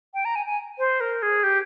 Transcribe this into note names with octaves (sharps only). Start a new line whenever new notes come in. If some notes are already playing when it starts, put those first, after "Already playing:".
G5
A#5
G#5
G#5
C5
A#4
G#4
G4